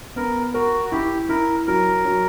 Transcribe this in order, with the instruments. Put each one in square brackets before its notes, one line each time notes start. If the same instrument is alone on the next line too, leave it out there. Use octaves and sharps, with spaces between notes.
[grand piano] B3 [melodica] A#4
[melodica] F#4 [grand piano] A#4
[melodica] F#4
[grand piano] E4 [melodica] G4
[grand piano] E4 [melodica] A#4
[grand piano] F#3 [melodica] A#4
[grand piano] F#3